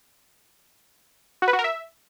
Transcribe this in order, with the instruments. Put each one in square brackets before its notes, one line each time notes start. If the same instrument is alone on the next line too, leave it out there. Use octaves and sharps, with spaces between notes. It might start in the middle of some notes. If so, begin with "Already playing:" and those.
[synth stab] F#4
B4
F#4
A#4
E5